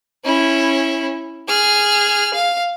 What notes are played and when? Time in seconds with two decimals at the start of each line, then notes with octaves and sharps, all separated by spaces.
0.24 C#4 E4
1.48 G#4 F6
2.34 F5